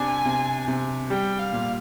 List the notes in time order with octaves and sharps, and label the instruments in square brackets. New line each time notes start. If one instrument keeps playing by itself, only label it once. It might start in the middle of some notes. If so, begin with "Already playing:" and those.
Already playing: [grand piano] C3 D4 [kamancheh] G#5
[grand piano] C3
C3
[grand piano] G3 [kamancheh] G5
[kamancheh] F5
[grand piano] A#2